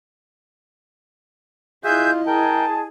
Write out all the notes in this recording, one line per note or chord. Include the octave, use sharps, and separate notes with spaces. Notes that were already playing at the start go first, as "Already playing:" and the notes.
E4 F4 G#4 D#5 E5 F#6 G6
G#4 A#4 G5 A5